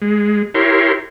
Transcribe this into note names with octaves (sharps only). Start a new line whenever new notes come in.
G#3
E4 G4 A#4 C#5 C6